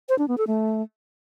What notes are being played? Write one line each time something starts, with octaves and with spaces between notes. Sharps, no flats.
C5
D4
B3
A4
A3